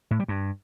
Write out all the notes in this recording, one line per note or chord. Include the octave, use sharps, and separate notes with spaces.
A2
G3
G2